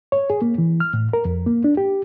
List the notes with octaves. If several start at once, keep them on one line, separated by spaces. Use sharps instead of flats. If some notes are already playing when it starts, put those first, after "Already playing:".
C#5
G#4
A#3
E3
F6
A2
A#4
F2
A#3
D4
G4